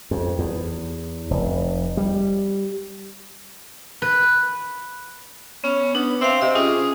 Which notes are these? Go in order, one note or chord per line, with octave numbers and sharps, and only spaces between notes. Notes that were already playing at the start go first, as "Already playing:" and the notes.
F2
E2
F1
G3
B4
B3 C#4
B3 D4
C4 E5 F5
C3 D#5
C#4 F4 G#4